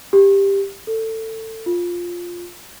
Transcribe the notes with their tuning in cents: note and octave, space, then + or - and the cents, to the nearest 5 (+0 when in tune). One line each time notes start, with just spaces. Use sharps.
G4 +10
A4 +20
F4 +5